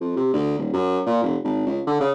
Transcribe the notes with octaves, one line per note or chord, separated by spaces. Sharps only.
F2
C3
D2
D#1
F#2
A#2
F1
G#1
C#2
D3
C#3